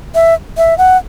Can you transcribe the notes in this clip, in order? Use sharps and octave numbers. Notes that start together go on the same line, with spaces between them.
E5
E5
F#5